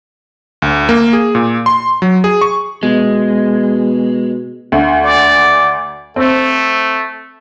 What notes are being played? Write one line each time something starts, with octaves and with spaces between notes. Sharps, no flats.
D2
A#3
G#4
A#2
C6
F#3
G#4
C#6
B2 G#3
D2
D5
A3 C4